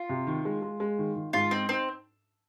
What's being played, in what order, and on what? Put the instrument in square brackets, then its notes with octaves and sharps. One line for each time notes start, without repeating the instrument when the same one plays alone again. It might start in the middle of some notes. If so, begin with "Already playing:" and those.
Already playing: [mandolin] F4
[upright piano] C3
D#3
G#3
G#3
G#3
D#3
D#3
[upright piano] G#2 [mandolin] F4
[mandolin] C4 [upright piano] D#4
[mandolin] C4 [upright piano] D#4